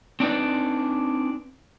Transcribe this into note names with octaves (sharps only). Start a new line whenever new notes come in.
C4 D4 D#4 B4 D5